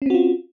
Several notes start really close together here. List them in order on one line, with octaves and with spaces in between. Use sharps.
C#4 C4 F#4 F4